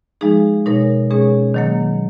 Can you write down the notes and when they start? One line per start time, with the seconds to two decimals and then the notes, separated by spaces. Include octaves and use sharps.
0.21 F3 G#3 D#4 G#4
0.66 B2 G#3 D#4 A#4 C#5
1.10 B2 G#3 C#4 G#4 C#5
1.54 D#3 F#3 A#3